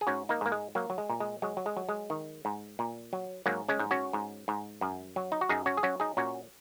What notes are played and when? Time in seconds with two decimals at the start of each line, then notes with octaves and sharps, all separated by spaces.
0.01 G#4
0.07 G#2 C#4 F#4
0.29 A#3 D#4
0.41 G#2 A#3
0.52 G#3
0.75 F#3 A#3
0.90 F#3
0.98 G#3
1.09 A#2
1.20 G#3
1.42 F#3 G#3
1.57 F#3
1.66 G#3
1.77 F#3
1.89 G#3
2.10 D#3
2.45 G#2
2.79 A#2
3.13 F#3
3.46 G#2 F#3 A#3
3.68 G#3 C#4
3.79 G#2
3.91 C#4 F#4
4.13 G#2
4.48 G#2
4.81 F#2
5.16 F#3
5.32 D#4
5.41 F#4
5.49 F#2 D#4 G#4
5.66 C#4 F#4
5.77 G#4
5.83 F#3 C#4 F#4
6.00 D#4 G#4
6.17 A#2 C#4 F#4